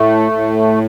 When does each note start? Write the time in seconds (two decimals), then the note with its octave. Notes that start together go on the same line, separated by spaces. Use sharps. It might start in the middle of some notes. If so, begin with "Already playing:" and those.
Already playing: A2 A3
0.32 A2